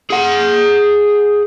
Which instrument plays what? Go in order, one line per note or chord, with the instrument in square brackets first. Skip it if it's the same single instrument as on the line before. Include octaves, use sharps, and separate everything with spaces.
[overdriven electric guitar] G#4 F#5